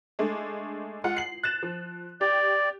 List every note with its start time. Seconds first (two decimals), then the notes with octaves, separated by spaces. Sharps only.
0.19 G#3 A3 D4
1.04 G#3 F4 F#5
1.17 C7 F#7
1.43 F#6 A6 E7
1.63 F3
2.21 G4 D5